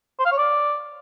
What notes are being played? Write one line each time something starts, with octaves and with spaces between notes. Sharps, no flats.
C5
F5
C#5
D5